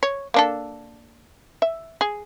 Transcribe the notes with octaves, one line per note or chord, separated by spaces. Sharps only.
C#5
A#3 D4 A4
E5
G#4